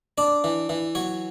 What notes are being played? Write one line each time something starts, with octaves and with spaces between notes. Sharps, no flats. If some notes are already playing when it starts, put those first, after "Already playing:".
D4 D5
E3
E3
F#3 C#5